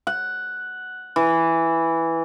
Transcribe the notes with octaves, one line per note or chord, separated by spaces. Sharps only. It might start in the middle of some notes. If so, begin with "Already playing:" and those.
F#5
E3